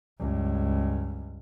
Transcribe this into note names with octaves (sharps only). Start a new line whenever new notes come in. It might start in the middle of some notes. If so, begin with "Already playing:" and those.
C#2 G2